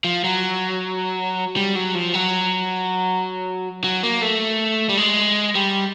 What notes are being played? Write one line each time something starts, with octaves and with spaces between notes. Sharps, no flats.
F3
F#3
G3
F#3
F3
F#3
F#3
A#3
A3
G3
G#3
G3